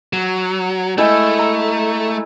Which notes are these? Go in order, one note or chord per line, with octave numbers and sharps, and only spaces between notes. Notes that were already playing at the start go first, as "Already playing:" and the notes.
F#3
G#3 A3 E4 G5
A#5